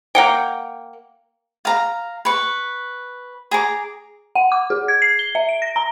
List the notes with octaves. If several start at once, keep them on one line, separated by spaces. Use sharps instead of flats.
A#3 F#5 G5
F5 A#5
B4 C#6
G#4 A#5 D6
F#5
D6
G#4
G#6
C7
G7
E5
D7
A#6
A#5